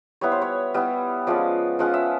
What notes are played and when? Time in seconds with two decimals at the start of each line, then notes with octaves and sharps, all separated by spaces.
0.21 G3 B3 E4 C#5
0.32 C5
0.42 C#5
0.74 G3 B3 E4
1.27 F3 G#3 C#4 D5
1.79 F3 G#3 C#4 F#5
1.94 E5